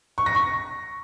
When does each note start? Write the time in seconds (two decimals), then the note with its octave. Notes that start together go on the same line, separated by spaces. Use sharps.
0.18 C#6
0.26 A#6
0.35 C#6